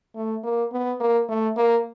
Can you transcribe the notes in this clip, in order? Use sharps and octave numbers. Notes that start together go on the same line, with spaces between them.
A3
A#3
B3
A#3
A3
A#3